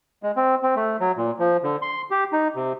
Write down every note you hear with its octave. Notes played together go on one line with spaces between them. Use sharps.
G#3
C4
C4
A3
F#3
A#2
F3
D3
C6
G4
D#4
C3